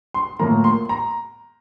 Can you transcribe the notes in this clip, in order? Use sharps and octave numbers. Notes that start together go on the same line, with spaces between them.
C6
A2 F3 A#3 A#5
C6
A#5